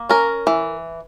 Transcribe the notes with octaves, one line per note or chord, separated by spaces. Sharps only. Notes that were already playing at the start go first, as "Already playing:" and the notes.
Already playing: A#3
C#4 A#4
E3